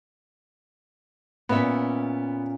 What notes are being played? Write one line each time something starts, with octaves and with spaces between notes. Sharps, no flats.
A#2 B3 C#4 E5